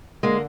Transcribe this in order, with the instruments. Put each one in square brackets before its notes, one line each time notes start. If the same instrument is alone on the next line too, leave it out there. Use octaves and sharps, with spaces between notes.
[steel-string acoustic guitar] D3 G#3 A#3